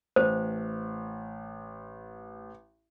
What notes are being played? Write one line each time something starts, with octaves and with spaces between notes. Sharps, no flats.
A1 C5